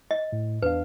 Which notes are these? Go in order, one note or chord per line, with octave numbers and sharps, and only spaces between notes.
D#5
A2
E2 D4 B4 F5